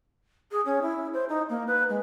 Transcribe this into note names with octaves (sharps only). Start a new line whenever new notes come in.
G#4
C#4
E4
C5
D#4
A#3
B4
G#3